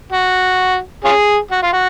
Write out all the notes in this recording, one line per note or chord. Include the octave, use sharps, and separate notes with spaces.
F#4
C#4 F4 G#4
F#4
F4
F#4